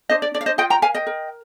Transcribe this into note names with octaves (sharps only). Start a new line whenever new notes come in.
D4 C5 D#5
D5
D4 D5
F5
C5 D#5
F4 D#5 G5
G5 A#5
A#4 F5 G#5
D#5 G5
A#4